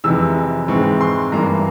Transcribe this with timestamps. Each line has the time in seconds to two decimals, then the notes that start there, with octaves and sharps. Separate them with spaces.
0.04 F2 C3 E3 G#3 E6
0.68 G#2 E3 G#3 C4 C#6
1.01 C6
1.32 G2 E3 A#3 A#5